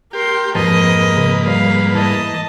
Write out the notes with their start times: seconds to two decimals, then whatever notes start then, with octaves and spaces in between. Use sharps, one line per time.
0.13 G4 A#4 C6
0.55 F2 G#2 F3 A#3 A#4 B4 D#5 A5
1.17 C#3
1.47 G3 F5
1.94 E3 D#5 A5